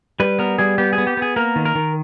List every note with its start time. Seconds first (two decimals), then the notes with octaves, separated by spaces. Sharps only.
0.20 G3 B4
0.39 B3 A#4
0.59 G3 G#4
0.78 B3 G4
0.93 G#4
0.98 B3
1.07 G4
1.17 B3 G#4
1.36 A#3 A#4
1.56 D#3
1.65 A#4
1.75 D#3